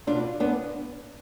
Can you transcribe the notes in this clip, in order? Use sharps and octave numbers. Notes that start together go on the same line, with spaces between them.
B2 D4 F4
B3 D4